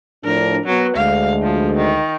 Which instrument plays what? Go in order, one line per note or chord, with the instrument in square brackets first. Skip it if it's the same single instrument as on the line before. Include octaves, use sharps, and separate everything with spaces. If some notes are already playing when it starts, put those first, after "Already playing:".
[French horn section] A2 F3 D4 [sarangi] A#4
[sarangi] F#3 [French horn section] B3
[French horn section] D2 G#3 [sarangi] F5
[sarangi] F3
D#3